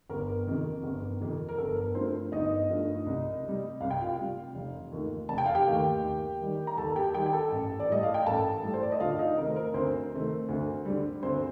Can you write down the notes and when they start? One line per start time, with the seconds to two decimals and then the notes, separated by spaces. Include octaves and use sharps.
0.10 G1 A#4
0.47 F2 C3 D#3
0.83 G1
1.21 F2 C3 D#3
1.49 A#4
1.58 G1 A4
1.77 A#4
1.95 G2 F3 A3 C4 C5
2.32 G1 D#4 D#5
2.70 G2 F3 A3
3.06 C2
3.44 C3 G3
3.81 C2 F5
3.91 G5
4.01 F4 F5
4.17 C3 G3
4.55 F1
4.92 D#2 D#3 A3
5.29 F1 A5
5.38 G5
5.46 F5
5.55 G4 G5
5.67 D#2 D#3 A3
6.04 D#2
6.41 D#3 G3
6.67 A#5
6.77 D#2 A4 A5
6.96 G4 G5
7.14 D#3 G3 G4 G5
7.26 G5
7.33 A4 A5
7.52 A1
7.80 D5
7.89 A2 G3 D#5
8.03 F5
8.14 G5
8.26 A1 A4 A5
8.63 A2 G3
8.74 C5
8.82 D5
8.92 D#5
9.00 D2 F4 F5
9.19 D#4 D#5
9.37 C3 D#3 A3 A#4
9.50 C5
9.56 A#4
9.74 D2 C4 C5
10.12 C3 D#3 A3
10.49 D2
10.85 D3 G3
11.23 D2 C4 C5